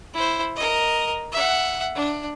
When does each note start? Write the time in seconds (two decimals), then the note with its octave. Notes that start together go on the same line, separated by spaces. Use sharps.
0.14 E4 C5
0.56 A#4 D#5
1.32 E5 F#5
1.95 D4